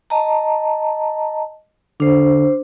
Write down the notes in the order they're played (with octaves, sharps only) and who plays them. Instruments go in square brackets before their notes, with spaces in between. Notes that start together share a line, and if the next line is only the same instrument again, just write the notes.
[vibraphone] D#5 A5 A#5
[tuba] D3 [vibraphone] D4 C5